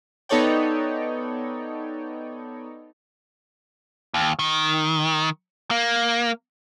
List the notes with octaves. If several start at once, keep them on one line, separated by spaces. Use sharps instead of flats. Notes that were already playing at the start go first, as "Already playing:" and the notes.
B3 D#4 A4 C#5 D5 G5
D#2
D#3
A#3